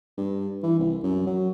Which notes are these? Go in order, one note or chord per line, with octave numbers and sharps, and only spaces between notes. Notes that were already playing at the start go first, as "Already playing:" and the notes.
G2
E3
C2
F#2
F#3